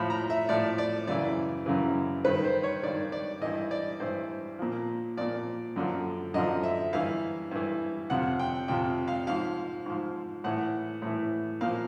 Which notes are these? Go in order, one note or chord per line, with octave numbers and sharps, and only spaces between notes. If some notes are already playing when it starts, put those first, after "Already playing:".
Already playing: A2 F3 B5
A#5
E5
A2 F3 D5
D5
F#2 C#3 E3 D5
F#2 C#3 E3
G2 D#3 B4
C5
C#5
G2 D#3 D5
D5
G2 E3 D#5
D5
G2 E3 C5
A#2 F3
A#2 F3 D5
F#2 D3 F3
F#2 D3 F3 D#5
E5
G2 E3 F5
G2 E3
F2 C3 F3 F#5
G5
F2 C3 F3 G5
F5
G#2 F3 F5
G#2 F3
A2 E3 F#5
A2 E3
A#2 F3 F5